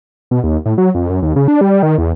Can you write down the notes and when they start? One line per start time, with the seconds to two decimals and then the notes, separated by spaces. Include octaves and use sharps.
0.31 B2
0.44 D#2
0.66 A2
0.78 F#3
0.95 F2
1.10 F#2
1.22 D#2
1.36 C#3
1.48 D4
1.61 G3
1.83 D#3
1.98 E2